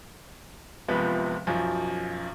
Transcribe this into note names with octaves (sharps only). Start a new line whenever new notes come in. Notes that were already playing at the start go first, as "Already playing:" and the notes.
F#1 C#2 C3 F3 B3 B4
B1 F#2 F3